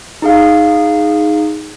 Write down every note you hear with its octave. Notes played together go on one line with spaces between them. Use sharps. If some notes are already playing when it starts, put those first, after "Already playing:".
D#4 G#4 F5